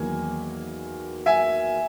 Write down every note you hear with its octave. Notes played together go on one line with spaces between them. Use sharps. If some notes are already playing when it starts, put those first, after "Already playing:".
Already playing: E2 D#3 F#3 A#3 G#5
E5 G#5